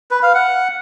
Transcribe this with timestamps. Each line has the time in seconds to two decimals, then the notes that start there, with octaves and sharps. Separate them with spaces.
0.11 B4
0.23 F5
0.34 F#5